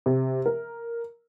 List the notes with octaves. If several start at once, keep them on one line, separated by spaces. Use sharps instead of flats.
C3
A#4